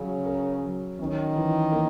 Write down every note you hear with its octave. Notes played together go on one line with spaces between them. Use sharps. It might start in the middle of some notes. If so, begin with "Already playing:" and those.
Already playing: C#3 F#3 C#4
A#4
F#3
D#3 C#4
E3
A#3